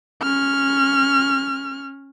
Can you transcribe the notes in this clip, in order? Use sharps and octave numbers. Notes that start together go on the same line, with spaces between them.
C#4 F6